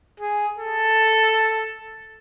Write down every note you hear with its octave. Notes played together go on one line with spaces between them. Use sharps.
G#4
A4